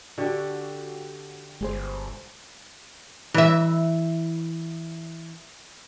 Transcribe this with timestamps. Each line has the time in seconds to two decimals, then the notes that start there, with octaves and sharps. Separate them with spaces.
0.18 D3 F#4 G4 A4
1.61 G1 G#3 G#4 C5
3.34 E3 E5